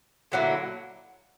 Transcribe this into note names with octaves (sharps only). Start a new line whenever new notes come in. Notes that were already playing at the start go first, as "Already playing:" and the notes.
D3 F#3 A#3 E4